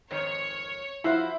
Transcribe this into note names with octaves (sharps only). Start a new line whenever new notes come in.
F2 G#2 D#3 C#5
F3 E4 F#4 C5